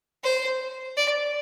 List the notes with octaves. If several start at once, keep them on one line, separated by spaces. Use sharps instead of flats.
C5
D5